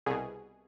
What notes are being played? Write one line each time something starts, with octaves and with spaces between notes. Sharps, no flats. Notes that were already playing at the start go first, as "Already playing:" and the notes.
C2 B2 G#4